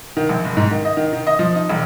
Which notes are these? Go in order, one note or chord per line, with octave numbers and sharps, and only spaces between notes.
D#3
A#1
F#1
G#2
D#3
D#5
D#3
D#3
D#5
F3
D#4
E1